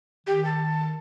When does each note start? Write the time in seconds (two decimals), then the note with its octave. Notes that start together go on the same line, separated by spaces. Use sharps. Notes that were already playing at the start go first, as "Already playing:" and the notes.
0.27 D#3 G4
0.45 A5